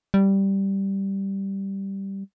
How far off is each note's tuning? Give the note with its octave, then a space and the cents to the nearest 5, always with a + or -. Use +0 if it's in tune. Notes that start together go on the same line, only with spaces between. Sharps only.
G3 -5